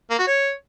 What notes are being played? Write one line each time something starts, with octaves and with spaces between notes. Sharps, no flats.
A#3
F#4
C#5